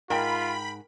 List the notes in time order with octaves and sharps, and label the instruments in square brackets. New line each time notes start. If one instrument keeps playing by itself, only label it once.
[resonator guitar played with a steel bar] G#2 [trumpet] F4 [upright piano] A#4 G5 [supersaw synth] B5